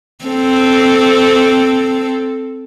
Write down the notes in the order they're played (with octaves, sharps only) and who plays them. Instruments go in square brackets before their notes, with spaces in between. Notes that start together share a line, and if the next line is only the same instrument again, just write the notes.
[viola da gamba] C4 A4